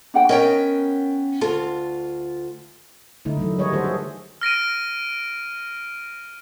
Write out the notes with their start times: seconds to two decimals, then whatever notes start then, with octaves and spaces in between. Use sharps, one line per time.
0.14 D4 F#5 G5
0.29 B3 C#4 A#4 C#5 D#5 G5
1.41 D2 F4 A4
3.25 D3 A3 D#4 E4
3.37 D#3 E3 F#3 A3
3.58 G3 G#4 B4 C#5 D#5
3.73 D#3 A3 F#4 A4 C5
3.84 G#4
4.41 F6 A#6 D7 D#7